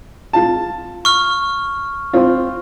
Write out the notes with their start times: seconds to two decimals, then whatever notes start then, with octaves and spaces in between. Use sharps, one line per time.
0.33 F4 A5
1.05 C#6 F6
2.13 C4 F4